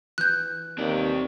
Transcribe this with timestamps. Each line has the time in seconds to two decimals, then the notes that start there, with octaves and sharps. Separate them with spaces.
0.18 E3 F#6 G6
0.78 D#2 C4 D5